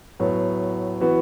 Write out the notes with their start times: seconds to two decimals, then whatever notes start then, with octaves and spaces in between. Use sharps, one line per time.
0.20 A2 F#3 B3
1.00 E3 B3 F#4